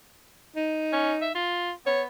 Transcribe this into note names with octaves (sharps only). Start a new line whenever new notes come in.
D#4
C#4
E5
F4
B3 C#5